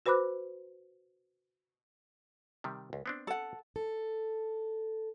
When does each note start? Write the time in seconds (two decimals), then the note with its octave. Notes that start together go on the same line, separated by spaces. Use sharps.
0.06 F#4 B4 C5 B5 D6 F#6
2.64 C3 D#3 G3
2.93 C#2
3.06 B3 C4 D4
3.27 A4 F#5
3.76 A4